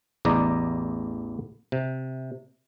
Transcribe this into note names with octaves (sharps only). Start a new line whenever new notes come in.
A1 E2 D5 D#5 A#5
C3